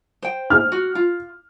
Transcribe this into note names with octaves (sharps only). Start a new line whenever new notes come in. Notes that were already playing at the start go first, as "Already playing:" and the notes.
C5 G5
F6
F#4
F4